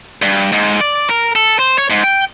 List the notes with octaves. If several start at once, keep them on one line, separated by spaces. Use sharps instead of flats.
G2
G#2
D5
A#4
A4
C5
C#5
G#2
G5